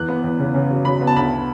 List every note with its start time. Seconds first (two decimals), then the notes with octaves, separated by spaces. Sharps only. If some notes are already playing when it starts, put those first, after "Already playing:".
Already playing: E2 F#6
0.09 B3
0.24 E2
0.39 C#3
0.54 C#3
0.70 F#3
0.85 F#3 B5
1.01 B3
1.07 A5
1.16 D2 B5